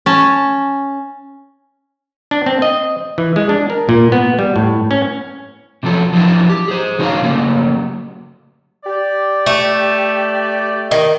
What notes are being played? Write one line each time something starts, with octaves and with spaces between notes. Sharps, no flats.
C#4 A5
D4
C4
D#5
E3
G#3
D4
A#4
A#2
B3
G3
A2
C#4
C3 F3 F#3 A4
F3 F#3 D4 E4
G4
G#4 C5
D3 D#4 F#4 C5 C#5 F5
C#3 F#3 G3 A3 A#3
G4 D5
A3
D#3